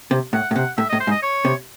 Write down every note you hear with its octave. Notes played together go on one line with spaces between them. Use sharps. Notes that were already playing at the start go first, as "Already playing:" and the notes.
C3
A2 F#5
A2
C3 F#5
A2 E5
D#5
A2
C5
G#2
D#5
C#5
C3